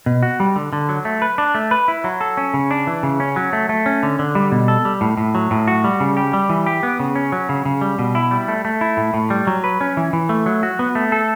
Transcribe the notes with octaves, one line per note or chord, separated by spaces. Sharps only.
B2
F#4
G3
D3
D3
F#3
A3
B4
D4
A3
B4
E4
F#3
A4
C#4
C#3
D4
E3
C#3
C#4
F#3
A3
A3
C#4
D3
D3
G3
B2
A4
G3
A2
A2
F#3
A2
F#4
G3
C#3
G4
G3
E3
G4
B3
C#3
C#4
F#3
C#3
C#3
G3
B2
E4
G3
A3
A3
E4
A2
A2
G3
F#3
B4
C#4
E3
E3
A3
F#3
F#4
B3
A3
A4